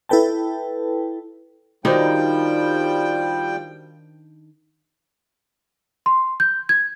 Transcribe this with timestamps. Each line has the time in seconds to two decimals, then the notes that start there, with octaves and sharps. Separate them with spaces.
0.09 E4 A4 B4 G5 A5
1.85 D#3 F3 G3 D4 D#4 F#4 C5 G5
6.06 C6
6.40 G6
6.69 G#6